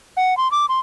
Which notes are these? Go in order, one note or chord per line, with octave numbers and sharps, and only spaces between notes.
F#5
C6
D6
C6